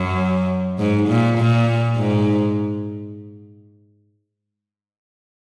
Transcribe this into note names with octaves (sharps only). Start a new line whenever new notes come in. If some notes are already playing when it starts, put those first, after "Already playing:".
Already playing: F#2
G#2
A#2
A#2
G#2